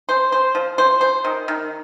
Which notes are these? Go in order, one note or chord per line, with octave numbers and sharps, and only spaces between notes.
C5
C5
F3
C5
C5
D#3
D#3